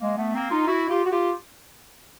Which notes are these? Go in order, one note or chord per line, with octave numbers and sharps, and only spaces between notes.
G#3 A#3
A3 B3
A#3 C4
D#4 F4
E4 F#4
F4 G4
F#4
F4 G4